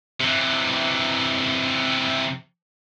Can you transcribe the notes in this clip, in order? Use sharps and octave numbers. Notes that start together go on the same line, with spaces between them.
C3 E3